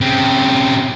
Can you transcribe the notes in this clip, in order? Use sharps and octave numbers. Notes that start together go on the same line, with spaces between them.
C#3 C4